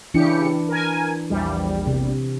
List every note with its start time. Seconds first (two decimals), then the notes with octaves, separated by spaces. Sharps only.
0.14 C#3 E3 D4 E4 G4 C#7
0.69 A#4 G#5
1.30 A#1 E2 G3
1.87 C3